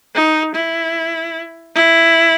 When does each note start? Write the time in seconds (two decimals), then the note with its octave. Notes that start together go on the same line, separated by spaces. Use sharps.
0.15 D#4
0.55 E4
1.75 E4